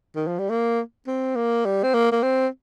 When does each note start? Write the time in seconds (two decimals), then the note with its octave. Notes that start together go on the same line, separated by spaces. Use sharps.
0.16 D#3
0.27 F3
0.39 G3
0.50 A#3
1.07 C4
1.36 A#3
1.65 G3
1.83 C4
1.94 A#3
2.12 A#3
2.23 C4